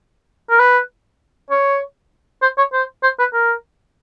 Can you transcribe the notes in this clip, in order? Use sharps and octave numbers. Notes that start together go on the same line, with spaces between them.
A#4
B4
C#5
C5
C#5
C5
C5
B4
A#4